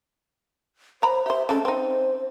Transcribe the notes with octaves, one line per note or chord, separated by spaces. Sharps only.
C5 C#5 A#5 B5
G4 C5 E5
G#3 A3 C#4 A4
C4 D#4 C5